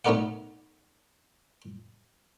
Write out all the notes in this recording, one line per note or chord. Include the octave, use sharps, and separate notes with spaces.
A3 B3 D#4 A#4 D5 F#5